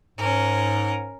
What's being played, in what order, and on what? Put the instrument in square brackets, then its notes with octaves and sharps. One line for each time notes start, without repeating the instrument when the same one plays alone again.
[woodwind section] G#2 [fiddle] C#4 A#4